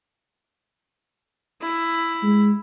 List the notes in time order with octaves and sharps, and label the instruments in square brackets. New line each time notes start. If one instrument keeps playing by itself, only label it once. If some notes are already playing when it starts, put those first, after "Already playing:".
[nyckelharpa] E4
[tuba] G#3